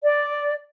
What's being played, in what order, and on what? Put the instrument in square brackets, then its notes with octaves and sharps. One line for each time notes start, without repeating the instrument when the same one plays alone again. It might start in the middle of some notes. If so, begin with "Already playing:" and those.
[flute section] D5